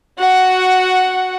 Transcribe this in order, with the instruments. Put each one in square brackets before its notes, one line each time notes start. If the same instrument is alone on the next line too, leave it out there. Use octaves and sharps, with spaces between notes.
[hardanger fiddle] F#4 F#5